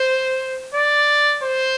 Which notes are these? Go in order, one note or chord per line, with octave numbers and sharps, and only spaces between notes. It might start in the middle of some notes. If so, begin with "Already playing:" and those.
Already playing: C5
D5
C5